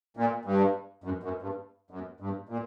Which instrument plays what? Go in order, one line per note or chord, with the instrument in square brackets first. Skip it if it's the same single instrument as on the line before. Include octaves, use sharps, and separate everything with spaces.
[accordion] A#2
G2
F#2
F#2
G2
F#2
G2
A#2